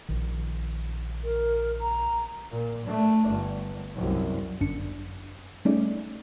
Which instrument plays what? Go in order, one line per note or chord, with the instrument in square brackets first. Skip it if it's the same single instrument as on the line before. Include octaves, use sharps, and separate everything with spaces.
[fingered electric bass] A#1 D#3
[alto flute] A#4
A#5
[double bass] A#2
A3 D4
G1
C2 F#2
[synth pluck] G1 F#2 D4 C#7
G3 A3 C#4 D#4 G#4 D5